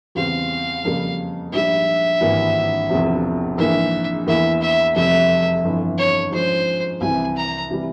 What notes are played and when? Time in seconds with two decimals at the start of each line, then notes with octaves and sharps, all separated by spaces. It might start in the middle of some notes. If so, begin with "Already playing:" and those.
0.15 E2 C#3 G3 C4 F5
0.85 F2 C#3 G3 A#3
1.52 A#1 G#2 G3 E5
2.21 G#1 G2 E3 G3 A#3
2.90 E1 E2 C3 F3
3.58 A#1 G#2 E3 A#3 E5
4.26 E2 E3 A#3 E4 E5
4.62 E5
4.96 F1 F2 C3 G3 E5
5.64 G1 F2 E3
5.98 C#5
6.32 G#2 F3 G#3 C#4 C5
7.01 C2 C3 E3 G#5
7.36 A#5
7.71 C3 E3 G3